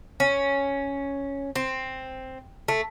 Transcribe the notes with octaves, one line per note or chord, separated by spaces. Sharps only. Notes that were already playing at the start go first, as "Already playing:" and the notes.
C#4
C4
A3